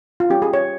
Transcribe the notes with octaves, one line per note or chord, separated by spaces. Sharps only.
F4
G3 C#4 G4
G#4
C#5